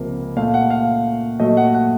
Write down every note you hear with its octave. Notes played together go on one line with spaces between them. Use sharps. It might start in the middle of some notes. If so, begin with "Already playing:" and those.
Already playing: C#2 C3 F3 A#3
A#2 A3 F5
F#5
F5
A#2 F#3 A3 D#5
F#5
F#5